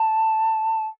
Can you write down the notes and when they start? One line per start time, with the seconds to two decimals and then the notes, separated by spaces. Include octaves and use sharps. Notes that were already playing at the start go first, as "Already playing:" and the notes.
Already playing: A5